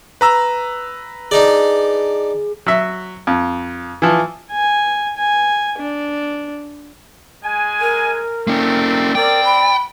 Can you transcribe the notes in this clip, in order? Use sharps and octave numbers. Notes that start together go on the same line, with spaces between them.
B4 A#5 E6
D4 D#4 G#4 D5
F#3 E5
F2
E3 F3
G#5
G#5
D4
G#3 G#5
A#4
A3 A#3 C4 C#4 D5
C4 A#4 D5 G5
B5